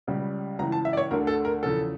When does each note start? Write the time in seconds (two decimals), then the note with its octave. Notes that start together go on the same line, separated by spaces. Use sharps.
0.07 C#2 C#3 G3
0.59 C#2 C#3 E3 A#5
0.72 A5
0.85 E5
0.93 D5
0.97 C#5
1.11 D2 D3 A3 A#4
1.27 A4
1.45 A#4
1.63 E2 C#3 F3 A4